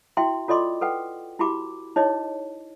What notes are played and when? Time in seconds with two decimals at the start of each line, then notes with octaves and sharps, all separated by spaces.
0.17 E4 F#4 E5 G5 C6
0.48 F4 A4 D5 D#5 C6 D6
0.81 A4 B4 F#5 G5
1.39 E4 F#4 G4 B5 D6
1.96 D#4 E4 G#4 C#5 D#5